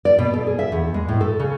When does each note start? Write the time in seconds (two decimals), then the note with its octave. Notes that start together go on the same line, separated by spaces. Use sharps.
0.05 D5
0.19 B2
0.34 A4
0.47 G#4
0.59 E5
0.72 E2
0.94 G#3
1.08 A2
1.21 A4
1.40 C#3